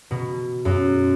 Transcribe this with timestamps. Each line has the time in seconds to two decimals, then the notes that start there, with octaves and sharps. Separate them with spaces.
0.11 B2
0.65 F#2